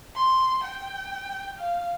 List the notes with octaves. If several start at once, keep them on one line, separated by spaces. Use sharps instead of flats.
C6
G5
F5